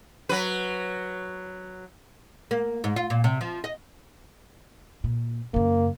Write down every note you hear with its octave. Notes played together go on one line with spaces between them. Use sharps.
F#3 B4
A#3
G#2
F4
A#2
C3
F3
D#5
A#2
F#2 C#3 A#3